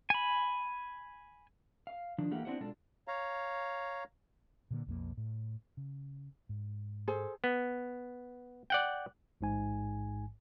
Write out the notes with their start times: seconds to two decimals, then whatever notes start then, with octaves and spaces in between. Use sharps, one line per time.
0.10 G#5 B5
1.87 F5
2.18 D#3 F3 D4
2.31 E3 A3 A#3 G4 F5 F#5
2.45 B3 C4 D4 E4 C5 F#5
2.60 B2 G#3 D4 F4 A4 A5
3.08 C#5 F5 A#5
4.71 A#2 D3 A#3
4.86 B1 F2 A#3
5.17 A2
5.77 C#3
6.49 G#2
7.08 G#4 A4 C5
7.44 B3
8.70 D5 F#5 G5
9.41 A1 G#2 G#5